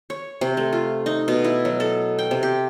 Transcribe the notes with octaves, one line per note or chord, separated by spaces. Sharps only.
C#5
C3
A3
F4
D#4
B2
E4
F#3
A4
G5
C3
G4